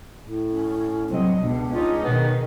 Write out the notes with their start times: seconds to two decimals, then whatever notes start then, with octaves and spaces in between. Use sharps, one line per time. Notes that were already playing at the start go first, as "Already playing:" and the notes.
0.22 A2
0.52 C#4
1.09 C2 F#3 C4 D4 D#5
1.41 C#2 B2 D4
1.72 C#4 D#4 F4 G#4
2.03 B2 D#3 B3